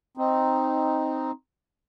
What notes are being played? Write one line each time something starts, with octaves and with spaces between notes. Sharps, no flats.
C4 D#4